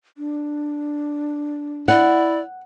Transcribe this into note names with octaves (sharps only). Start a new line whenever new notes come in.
D4
E4 D5 F#5